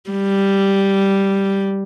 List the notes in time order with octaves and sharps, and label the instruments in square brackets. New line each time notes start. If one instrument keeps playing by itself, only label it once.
[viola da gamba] G3